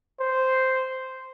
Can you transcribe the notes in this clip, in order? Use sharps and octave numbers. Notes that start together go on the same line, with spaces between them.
C5